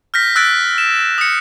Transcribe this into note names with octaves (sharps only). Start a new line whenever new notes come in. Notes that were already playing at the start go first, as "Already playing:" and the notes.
F6 G6 A#6 B6
E6 F#6 A6 B6 D7
E7
D#6 C#7